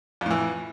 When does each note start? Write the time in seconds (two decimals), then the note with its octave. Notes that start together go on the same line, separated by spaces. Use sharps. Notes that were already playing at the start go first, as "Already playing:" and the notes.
0.21 F2
0.26 A2
0.31 E3